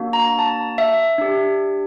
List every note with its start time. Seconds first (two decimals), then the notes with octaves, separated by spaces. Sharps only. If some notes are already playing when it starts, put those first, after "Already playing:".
Already playing: A#3 D4 F#4
0.13 A#5
0.39 A5
0.78 E5
1.18 D4 G4